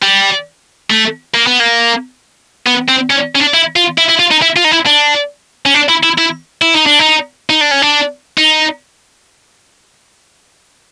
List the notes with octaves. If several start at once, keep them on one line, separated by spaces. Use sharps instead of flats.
G3
A3
A#3
B3
A#3
B3
C4
C#4
C#4
D4
E4
F4
E4
E4
F4
D#4
E4
F4
D#4
E4
D4
C#4
D4
E4
E4
E4
E4
D#4
D4
D#4
D#4
D4
C#4
D4
D#4